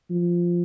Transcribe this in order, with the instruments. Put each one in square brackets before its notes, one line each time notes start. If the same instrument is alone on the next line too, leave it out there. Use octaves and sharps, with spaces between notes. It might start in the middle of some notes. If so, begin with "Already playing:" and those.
[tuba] F3